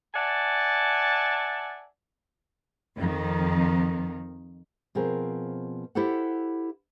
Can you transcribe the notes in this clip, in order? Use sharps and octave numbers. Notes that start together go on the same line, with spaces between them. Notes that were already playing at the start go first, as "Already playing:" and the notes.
D5 E5 F#5 G#5 A5
F2 D#3
B2 F3 C4 G#4 A#4
E4 G4 A4 C5 F#5